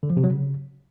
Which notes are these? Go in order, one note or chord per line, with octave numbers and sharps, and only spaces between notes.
D3
F3
C3
F#3
C#3